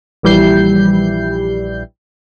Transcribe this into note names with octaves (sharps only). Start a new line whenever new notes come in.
A#1 E3 G3 E4 G6 C7